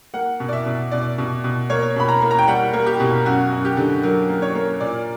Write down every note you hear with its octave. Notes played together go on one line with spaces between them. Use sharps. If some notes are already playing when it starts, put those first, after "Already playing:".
A#3 F#5
B2
D5
E5
B2
B2 D5
B2
B2
A#3 C#5
B2 B5
A#5
A#3
A#5
G5
G3 F#5
A#3
G4
B2
F#2 F#4
F#2
G4
D3
F#3 A#4
A#3
C#5
A#3
A#2 D5